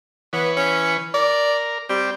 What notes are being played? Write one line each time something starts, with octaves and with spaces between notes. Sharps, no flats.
E3 B3 B4 C#5
C#4
A#4 D5
G3 C4 G4